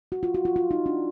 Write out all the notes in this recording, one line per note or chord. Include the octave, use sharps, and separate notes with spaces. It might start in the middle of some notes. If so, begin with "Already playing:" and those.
F#4
F4
F#4
F4
F4
D#4
D4